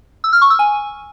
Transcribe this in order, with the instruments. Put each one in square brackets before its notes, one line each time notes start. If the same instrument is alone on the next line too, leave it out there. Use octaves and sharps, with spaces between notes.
[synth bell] E6
F6
C#6
E6
G#5